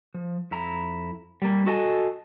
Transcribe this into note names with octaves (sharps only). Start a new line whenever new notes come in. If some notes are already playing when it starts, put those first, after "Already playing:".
F3
F2 E4 A#5
G3 A#3
F#4 A4 D#5 G#5 A5